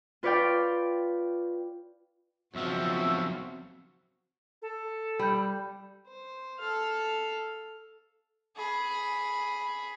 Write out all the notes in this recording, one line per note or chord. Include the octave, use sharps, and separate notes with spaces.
F4 B4 C#5 D5 F5 G5
B1 C#3 F3 C4 F#4 E5
A4
G3 B5 G6
C5
A4 F5
G#4 B5